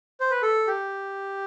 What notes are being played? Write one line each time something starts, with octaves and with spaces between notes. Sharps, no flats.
C5
B4
A4
G4